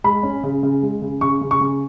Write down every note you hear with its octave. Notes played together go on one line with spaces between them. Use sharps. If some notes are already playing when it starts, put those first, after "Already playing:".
G#3 B5
C#4
C#3
C#3
G#3
C#3
C#3 C#6
C#3
C#6
C#3